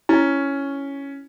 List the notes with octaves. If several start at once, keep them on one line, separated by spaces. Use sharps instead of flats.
C#4 E4